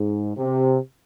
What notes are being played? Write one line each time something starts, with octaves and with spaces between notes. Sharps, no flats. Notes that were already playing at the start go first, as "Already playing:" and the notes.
Already playing: G#2
C3